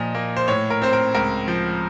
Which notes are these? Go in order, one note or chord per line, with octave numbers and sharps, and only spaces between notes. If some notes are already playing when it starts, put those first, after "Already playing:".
Already playing: A#2 F3 D#5
A#3
C5
A2 C#5
A#4
C4 C5
A#4
C#2 A#4
F3